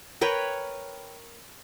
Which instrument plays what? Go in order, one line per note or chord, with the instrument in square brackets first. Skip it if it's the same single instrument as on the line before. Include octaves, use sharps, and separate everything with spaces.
[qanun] A#4 B4 C#5 G5